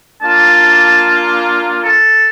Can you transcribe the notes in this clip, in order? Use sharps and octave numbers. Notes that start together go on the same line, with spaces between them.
A#3 D4 F4 A5
A4